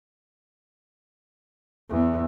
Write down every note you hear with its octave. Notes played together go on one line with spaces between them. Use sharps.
E2